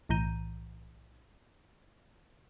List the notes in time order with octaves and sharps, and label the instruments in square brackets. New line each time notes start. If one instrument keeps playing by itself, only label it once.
[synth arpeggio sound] B1 A2 E3 A#5 G6 D#7